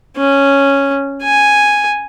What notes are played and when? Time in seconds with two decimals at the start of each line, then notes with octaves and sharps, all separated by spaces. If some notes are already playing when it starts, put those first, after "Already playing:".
0.17 C#4
1.23 G#5